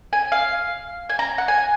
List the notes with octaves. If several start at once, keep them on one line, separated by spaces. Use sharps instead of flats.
G#5
F5
G#5
A#5
F#5
G#5